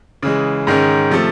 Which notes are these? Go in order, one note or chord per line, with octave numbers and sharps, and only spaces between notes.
C#3 E3 G#3
G#2 D#3 G#3 C#4
C3 F3 A3